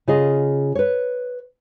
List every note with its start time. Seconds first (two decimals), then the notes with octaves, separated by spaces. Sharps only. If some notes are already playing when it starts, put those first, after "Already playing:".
0.08 C#3 F4 G#4 D#5
0.75 B4 C#5